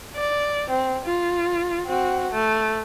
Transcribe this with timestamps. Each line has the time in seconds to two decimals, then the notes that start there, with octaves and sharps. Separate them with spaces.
0.17 D5
0.70 C4
1.05 F4
1.87 C4 F#4
2.32 A3